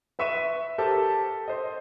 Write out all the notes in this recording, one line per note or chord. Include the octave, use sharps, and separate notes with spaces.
B4 E5 C#6 D#7 E7
G4 A4 A#4 C5 A5
C5 D#5